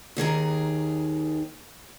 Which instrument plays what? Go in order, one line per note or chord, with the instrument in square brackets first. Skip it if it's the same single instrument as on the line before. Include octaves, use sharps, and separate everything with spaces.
[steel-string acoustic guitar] D#2 D#3 G#4 A#5